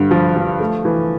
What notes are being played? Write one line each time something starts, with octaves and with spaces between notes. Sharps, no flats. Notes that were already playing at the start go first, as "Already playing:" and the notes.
Already playing: G2 D3
F3
F3
A3
E3